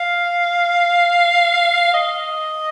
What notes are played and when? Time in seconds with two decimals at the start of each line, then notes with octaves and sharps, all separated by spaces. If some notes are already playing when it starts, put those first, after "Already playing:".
Already playing: F5
1.94 D#5